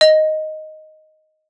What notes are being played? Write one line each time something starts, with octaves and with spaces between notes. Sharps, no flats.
D#5